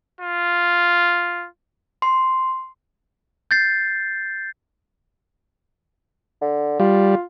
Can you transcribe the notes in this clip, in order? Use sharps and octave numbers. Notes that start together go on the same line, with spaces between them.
F4
C6
G6 A6 C7
D3
G3 F4